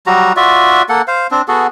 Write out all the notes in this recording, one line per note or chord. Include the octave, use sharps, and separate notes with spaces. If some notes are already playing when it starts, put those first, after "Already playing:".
F#3 G3 F#4 A#5
F4 F#4 D5 E5
A#3 A4 F#5
C5 F5
C4 D4
B3 F#4 G#4 A4